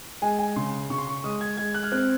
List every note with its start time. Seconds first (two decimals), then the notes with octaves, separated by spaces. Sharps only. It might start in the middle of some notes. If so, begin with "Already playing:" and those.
0.22 G#3 G#5
0.39 G#5
0.56 C#3 C6
0.90 C#3 C#6
0.98 C6
1.07 C#6
1.24 G#3 D#6
1.41 G#6
1.57 G#3 G#6
1.74 F#6
1.83 F6
1.92 C4 F#6